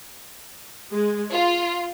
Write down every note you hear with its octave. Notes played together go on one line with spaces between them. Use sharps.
G#3
F4